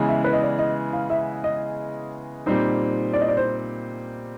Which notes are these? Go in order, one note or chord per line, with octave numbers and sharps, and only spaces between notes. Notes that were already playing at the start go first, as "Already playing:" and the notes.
Already playing: C#3 E3 G#3 B3
E5
B4
D#5
D5
D#5
F5
E5
D#5
A#2 G3 C4 D#4
D5
D#5
D5
C5